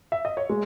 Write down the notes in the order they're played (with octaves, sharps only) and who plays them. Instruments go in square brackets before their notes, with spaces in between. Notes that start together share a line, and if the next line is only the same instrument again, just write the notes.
[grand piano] E5
D#5
C#5
[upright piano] G#3